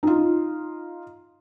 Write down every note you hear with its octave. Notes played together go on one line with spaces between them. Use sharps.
D#4 F4